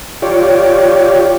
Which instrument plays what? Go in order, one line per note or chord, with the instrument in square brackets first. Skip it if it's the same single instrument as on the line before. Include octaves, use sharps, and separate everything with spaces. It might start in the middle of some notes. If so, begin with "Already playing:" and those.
[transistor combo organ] F4 G4 C#5 D5